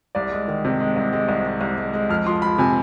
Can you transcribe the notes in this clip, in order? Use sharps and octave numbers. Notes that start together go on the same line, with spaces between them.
C2 D5
G#3
D#3
C3
G#3
C2
G#3
C2
G#3
C2
G#3
G#3
F2 F6
F3 C6
F3 B5
C3 G#5